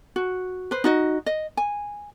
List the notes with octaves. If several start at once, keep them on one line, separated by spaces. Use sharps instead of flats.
F#4
B4 C5
D#4 F#4 D#5
D#5
G#5